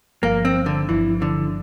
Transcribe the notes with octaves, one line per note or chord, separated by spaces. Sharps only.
G1 G2 F3 A#3
C4
D3
G1 G2 E3 F3
D3